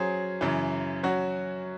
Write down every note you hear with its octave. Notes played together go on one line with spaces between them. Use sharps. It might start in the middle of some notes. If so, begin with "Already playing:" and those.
Already playing: F#3 C#4 G#4 C5
F#2 C#3 E3
F#3 C#4 F#4